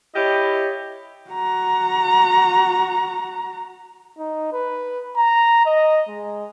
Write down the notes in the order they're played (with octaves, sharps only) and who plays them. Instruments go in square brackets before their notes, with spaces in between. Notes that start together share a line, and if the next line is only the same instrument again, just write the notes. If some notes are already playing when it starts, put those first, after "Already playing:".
[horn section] E4 G4 C#5 D#5
[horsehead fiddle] F#4 A#5
[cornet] D#4
B4
A#5
D#5
G#3